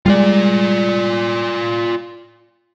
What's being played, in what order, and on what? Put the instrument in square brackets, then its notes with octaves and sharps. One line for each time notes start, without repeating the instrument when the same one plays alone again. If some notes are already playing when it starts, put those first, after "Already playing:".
[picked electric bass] G3 G#3 [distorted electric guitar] F4 D5